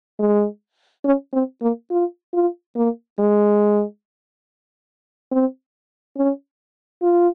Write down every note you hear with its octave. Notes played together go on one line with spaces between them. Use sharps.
G#3
C#4
C4
A#3
F4
F4
A#3
G#3
C4
C#4
F4